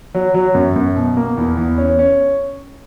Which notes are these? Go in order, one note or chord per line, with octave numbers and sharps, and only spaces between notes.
F#3
F#3
F#2
F#2
B2
A#3
E2
E2
C#4
C#4